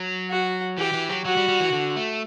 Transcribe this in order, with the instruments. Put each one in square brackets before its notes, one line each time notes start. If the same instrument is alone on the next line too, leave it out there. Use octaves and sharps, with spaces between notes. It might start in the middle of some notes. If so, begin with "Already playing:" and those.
Already playing: [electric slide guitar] F#3
[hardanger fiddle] F#4
[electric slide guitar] E3 [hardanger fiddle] G4
[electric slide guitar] E3
F#3
[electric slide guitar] F#3 [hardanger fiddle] F#4
[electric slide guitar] G3
G3
E3
D3
A3